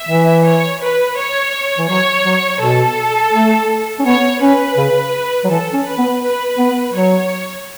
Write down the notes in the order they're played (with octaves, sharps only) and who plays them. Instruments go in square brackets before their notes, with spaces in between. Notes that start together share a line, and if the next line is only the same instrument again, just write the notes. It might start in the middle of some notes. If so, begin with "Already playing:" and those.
Already playing: [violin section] E5
[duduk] E3
[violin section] C#5
B4
C#5
[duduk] E3
[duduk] F#3 [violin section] C#5
[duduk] F#3
[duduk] B2 [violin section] A4
[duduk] A3
C#4
[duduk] B3 [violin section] C#5
[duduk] C#4 [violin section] B4
[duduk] C#3
F#3
[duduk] E3 [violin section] A4
[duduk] C#4
[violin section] B4
[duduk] B3
[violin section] B4
[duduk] B3
[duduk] F#3 [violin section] C#5